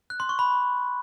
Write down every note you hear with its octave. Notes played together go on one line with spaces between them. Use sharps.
F#6
C6
C#6
B5